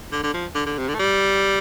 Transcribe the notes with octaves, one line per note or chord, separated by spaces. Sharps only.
D3
D3
F3
D3
D3
C3
D3
A3
G3